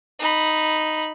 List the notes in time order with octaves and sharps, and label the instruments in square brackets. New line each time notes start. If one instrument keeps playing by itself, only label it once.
[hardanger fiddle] D#4 B5